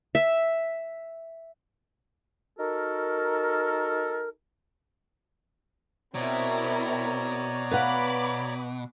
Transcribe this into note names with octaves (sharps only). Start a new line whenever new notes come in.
E5
D#4 F#4 A4 A#4
B2 C4 E4 A#4 C#5 D5 A#5
B4 F5 F#5 B5 D6